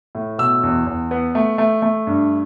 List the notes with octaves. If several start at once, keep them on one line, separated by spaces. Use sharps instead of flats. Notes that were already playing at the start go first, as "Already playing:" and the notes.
A2
B2 E6
E2
E2
B3
A3
A3
A3
G2